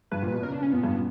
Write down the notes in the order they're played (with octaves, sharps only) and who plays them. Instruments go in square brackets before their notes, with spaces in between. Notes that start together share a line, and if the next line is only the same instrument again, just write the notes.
[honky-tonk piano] G2 [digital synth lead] B4
[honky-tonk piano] A#2
[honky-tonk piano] B2 [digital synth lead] B4
[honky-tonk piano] C#3 [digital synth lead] A#4
[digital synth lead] D4
C#4
[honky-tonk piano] A#2 [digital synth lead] B3
[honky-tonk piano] G2
A#2